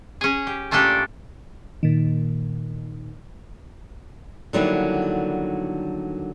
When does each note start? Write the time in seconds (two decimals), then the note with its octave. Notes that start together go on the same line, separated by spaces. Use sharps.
0.21 C#4 G#4
0.47 G4
0.71 A#2 A3 C#4 D4 G4
1.83 A#2 D#3
4.53 D3 D#3 F#3 G3 A#3 E4